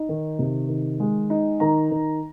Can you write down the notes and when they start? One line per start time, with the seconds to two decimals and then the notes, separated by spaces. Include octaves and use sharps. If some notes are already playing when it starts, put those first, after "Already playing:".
Already playing: D#4
0.09 D#3
0.39 C3
0.69 D#3
1.00 G#3
1.30 D#4
1.60 D#3 A#5
1.91 D#3